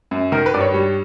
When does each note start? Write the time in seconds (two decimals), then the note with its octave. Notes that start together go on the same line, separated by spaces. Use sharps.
0.11 F#2
0.32 D#3 A#4
0.46 B4
0.54 G2 D5
0.61 C#5
0.74 G3